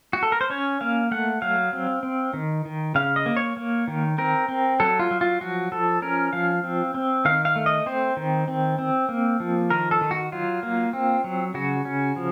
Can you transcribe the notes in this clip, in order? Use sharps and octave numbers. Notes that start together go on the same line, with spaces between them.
F#4
A4
A#4
C5
C#4 C#5
A#3 F5
A3 F#5
F#3 F5
C4
C4
D#3
D#3
C#3 F5
D#5
A#3
C#5
A#3
D#3
C4 A#4
C4
F#3 A4
F4
F#3
F4
F3 F#4
F3 A4
C#4 A#4
F3 F5
C4
C4
D#3 F5
F5
A3
D#5
C4 C5
D#3
C4
C4
A#3
F3
D#3 A#4
A4
D#3
F#4
F#3 F4
A#3
C4
F#3
C#3 F#4
C#4
F3